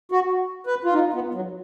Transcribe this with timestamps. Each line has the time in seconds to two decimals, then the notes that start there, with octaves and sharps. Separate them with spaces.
0.12 F#4
0.67 B4
0.85 F4
0.93 D#4
1.14 B3
1.34 F#3